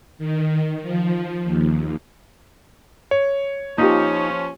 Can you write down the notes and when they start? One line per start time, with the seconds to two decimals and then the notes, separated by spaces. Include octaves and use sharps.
0.18 D#3
0.82 F3
1.43 D#2
3.11 C#5
3.78 F3 A#3 C#4 D#4 F4 G4